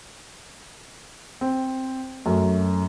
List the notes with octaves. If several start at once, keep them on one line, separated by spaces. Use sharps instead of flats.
C4
F#2 A3